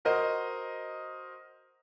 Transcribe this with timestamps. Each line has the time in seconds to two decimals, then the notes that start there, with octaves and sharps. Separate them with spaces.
0.05 F#4 A#4 C5 D#5